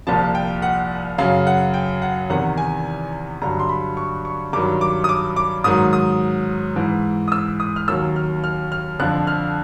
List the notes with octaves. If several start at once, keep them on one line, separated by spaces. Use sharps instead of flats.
C2 A#2 F3 A5
G5
F#5
F#2 C#3 F#3 F5
F#5
G5
F#5
E2 C3 D#3 F#5
G#5
G2 D3 F#3 A#5
C6
B5
C#6
C#6
G2 D#3 F#3 D6
D6
D#6
D6
D6
G#2 D#3 F#3 D#6
D#6
G#2 E3
D#6
E6
D#6
F6
D#2 D#3 F#3 E6
F6
F6
F6
F2 D3 F3 F#6
F6